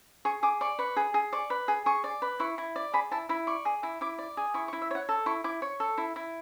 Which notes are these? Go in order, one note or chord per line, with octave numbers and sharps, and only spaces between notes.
G#4 C#6
G#4 D6
D5 C#6
B4 C#6
G#4
G#4
D5 C#6
B4
G#4
G#4 C#6
D5
B4
E4 C#6
E4
D5
G#4 B5
E4 A5
E4 B5
D5 C#6
G#4
E4
E4 D6
D5
G#4
E4 C#6
C#6
E4
E5
C#5 F#5
A4 A5
E4 C#6
E4 D6
C#5 C#6
A4
E4
E4